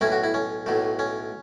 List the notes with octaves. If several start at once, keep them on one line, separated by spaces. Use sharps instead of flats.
B1 A2 A3 C#4 E4
F#4
E4
C#4
B1 A2 F#3 A3
C#4